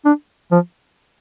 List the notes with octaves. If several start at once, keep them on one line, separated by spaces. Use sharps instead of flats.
D4
F3